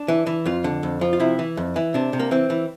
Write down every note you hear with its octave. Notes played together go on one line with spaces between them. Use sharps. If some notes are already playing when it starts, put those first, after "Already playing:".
Already playing: D4
E3
E3
F2 F4
D3
F2
F3
F4
C3 E4
E3
F2
E3
C3 D4
C3
A#3
E3 C4
E3